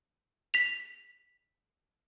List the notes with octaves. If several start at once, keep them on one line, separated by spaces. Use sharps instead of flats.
B6 F7